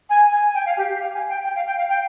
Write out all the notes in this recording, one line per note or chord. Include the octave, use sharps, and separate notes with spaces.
G#5
G#5
G5
F5
G4
G4
F5
G#5
G5
G5
F5
G5
F5
G5